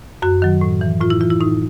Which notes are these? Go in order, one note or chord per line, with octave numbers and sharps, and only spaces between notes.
F#2 F#4
D#3 F#3
A2
E3
A2 F4
E4
E3 F4
E4
A2 D#4